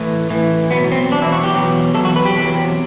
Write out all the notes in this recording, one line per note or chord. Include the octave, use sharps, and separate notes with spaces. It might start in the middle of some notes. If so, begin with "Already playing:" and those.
Already playing: A2 E3
A2 E3
E2 B2 F#3 B3
C4
E2 B2 F#3 D4
E4
F#4
G4
E2 B2 F#3
E2 B2 F#3 A4
F#4
B4
G4
E2 C3 F#3